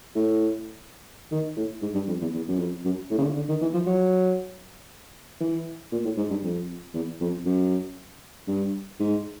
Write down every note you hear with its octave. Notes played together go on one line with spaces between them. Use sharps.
A2
D#3
A2
G#2
G2
F2
E2
E2
F#2
F2
F#2
A2
C#3
D3
D3
D#3
E3
F3
F#3
E3
A#2
A2
G#2
G2
F2
E2
F2
F#2
G2
G#2